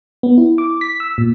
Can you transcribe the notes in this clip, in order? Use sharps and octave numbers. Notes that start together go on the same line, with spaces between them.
B3
E4
D6
B6
E6
A#2